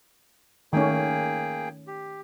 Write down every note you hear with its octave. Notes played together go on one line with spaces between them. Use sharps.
D#3 A3 A#3 C#4 G#4 G5
G4